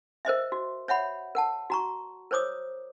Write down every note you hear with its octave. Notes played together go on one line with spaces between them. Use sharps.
A#4 C5 D#5 E5
F#4
C#5 E5 F#5 B5
A#4 F#5 A5
F#4 A#5 C#6
A#4 C5 C#5 D6 D#6